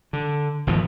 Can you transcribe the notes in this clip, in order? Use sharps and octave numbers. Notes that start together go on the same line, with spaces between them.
D3
G#1 B2 F3